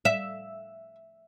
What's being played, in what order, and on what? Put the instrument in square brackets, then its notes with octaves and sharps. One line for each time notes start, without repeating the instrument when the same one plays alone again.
[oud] E5